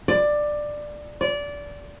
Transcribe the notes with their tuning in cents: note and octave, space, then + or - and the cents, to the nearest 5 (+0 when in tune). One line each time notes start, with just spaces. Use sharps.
D5 +15
D5 -20